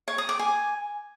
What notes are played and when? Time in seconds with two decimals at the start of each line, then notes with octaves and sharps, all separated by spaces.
0.08 C#5
0.18 D#6
0.29 D6
0.39 G#5